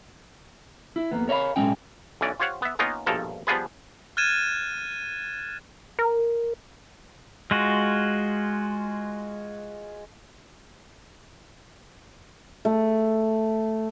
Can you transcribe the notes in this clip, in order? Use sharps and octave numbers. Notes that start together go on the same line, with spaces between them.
E4
F2 A#3 B3
A#4 C#5 D#5 F5 B5
B1 F2 A2 G#3 C#4 G5
B1 E3 C#4 D5
F4 G4 C5 C#5 F5 F#5
B3 E5
A#3 B3 C#4 D#4 F4 A#4
A#1 G2 B2 F3 A4 A#4
F3 G3 B3 F4 G#4 B4
F6 F#6 G#6 A6 D#7 E7
A#4
G#3 F4 F#4
A3